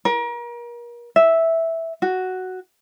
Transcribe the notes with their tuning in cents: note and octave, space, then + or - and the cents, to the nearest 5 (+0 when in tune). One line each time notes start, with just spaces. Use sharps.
A#4 +35
E5 -5
F#4 +5